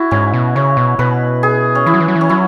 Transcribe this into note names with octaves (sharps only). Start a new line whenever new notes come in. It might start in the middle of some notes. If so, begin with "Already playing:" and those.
Already playing: E4 F#4
G#2 C#4
B2
C#3 C#5
B2
B2 B4
G#4
C#4
E3 E4
F#3
E3
F#3
E3
C#4
F#3 E4